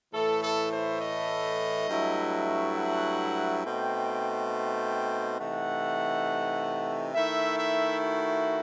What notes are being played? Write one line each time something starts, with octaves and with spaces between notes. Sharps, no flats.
A2 E3 A3 A4
A4
C5
D#5
G2 F#3 A3 E4
F#5
B2 A3 C4 D#4 G5
G5
C3 E3 A3 D#4 F#5
D#3 A3 E4 E5
E5
F#4